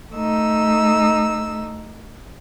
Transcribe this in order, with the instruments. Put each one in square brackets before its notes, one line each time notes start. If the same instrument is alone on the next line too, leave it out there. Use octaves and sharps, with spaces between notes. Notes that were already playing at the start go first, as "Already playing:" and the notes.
[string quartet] A3 D#4 E6